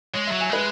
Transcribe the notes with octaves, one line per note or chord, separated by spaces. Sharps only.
G#3 C#5
E5
F#3
G#5
G#3 B4